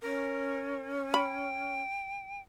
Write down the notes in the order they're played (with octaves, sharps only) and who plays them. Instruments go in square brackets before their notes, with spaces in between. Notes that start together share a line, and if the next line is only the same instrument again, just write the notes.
[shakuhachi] C#4 [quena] A#4
[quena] G5 [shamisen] B5